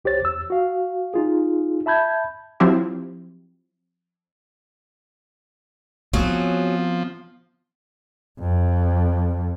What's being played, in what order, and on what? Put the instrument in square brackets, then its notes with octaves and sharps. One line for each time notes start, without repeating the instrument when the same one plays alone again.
[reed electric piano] C2 G4 C5 C#5 A6
E2 E6
F#4 F5
D#4 F4 G#4
E5 A5 B5 G6 G#6
[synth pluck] F3 F#3 C4 E4 G4
[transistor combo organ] F3 [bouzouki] F#3 G#4 [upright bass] B3 C4
[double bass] F2